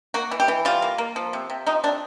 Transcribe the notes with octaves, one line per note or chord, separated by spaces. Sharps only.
A#3 F#4
E3
G4
E3
G3 F4
A#3
A#3
F3
C3
C3
F3 D#4
C3 D4